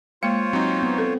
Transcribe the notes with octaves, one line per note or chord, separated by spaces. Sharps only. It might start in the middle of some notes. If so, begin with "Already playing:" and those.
G#3 A#3 F4 C5 C#5 C#7
F#3 C4 D#4
B3
C4 A4